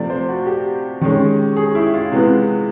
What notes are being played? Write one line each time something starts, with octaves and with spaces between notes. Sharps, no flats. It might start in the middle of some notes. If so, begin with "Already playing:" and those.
Already playing: C3 F3 A3 D5
C5
F#4
G4
D#3 G#3 C#4
G#4
E4
F4
C3 E3 G#3 B3